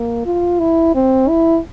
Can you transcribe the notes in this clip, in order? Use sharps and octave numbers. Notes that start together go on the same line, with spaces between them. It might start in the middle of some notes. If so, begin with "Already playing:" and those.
Already playing: A#3
F4
E4
C4
E4